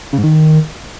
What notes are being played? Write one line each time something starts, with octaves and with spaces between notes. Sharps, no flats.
C#3
G#2
D#3